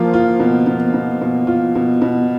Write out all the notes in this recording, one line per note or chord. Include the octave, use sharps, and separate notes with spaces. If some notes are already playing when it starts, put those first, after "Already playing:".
Already playing: F3 A#3 F4
F4
B2
B2
B2
B2
F4
B2
B2